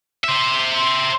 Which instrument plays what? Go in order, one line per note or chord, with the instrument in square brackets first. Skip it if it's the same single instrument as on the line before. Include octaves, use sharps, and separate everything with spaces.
[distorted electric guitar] C5 E5